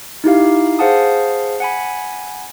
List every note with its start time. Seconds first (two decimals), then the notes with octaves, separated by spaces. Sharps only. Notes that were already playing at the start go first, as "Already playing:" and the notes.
0.24 D#4 E4 G4 F5
0.79 G#4 C5 F5 F#5 A5 D#6
1.60 F#5 G#5 B5